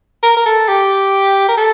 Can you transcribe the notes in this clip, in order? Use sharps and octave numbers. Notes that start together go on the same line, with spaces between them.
A#4
A#4
A4
G4
A#4
A4